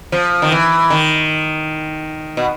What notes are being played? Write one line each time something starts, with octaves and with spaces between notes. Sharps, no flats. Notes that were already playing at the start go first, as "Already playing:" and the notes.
F3
D#3
E3
D#3
B2